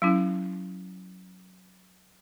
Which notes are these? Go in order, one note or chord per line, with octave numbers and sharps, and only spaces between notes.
F#3 C#4 E4